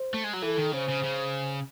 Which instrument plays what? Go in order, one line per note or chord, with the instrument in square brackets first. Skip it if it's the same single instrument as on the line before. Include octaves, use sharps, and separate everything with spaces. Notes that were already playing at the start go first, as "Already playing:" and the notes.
Already playing: [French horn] C5
[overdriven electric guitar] A3
G#3
F#3
[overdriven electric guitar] E3 [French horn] A4
[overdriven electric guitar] D#3
[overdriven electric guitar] C#3 [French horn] C5
[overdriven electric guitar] C#3
C#3